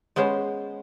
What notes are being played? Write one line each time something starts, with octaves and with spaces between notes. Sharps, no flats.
G#3 B3 C#4 C5